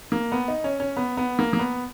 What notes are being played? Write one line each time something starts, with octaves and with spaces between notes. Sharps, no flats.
A#3
B3
D#4
C#4
C#4
B3
B3
A#3
A#3
B3